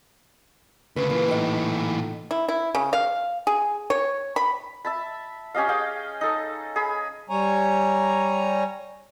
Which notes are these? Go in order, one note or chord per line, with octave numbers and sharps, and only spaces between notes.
D2 C#3 B4
A#2 E3 A#3
A2 D#4
E4
E4
C#3
F5
G#4
C#5
B5
E5 A5 B5
C#4 G4 D#5 F5
G#4 F5 G5
D#4 A4
G#4 B5
G3 C#5 G#5 A#5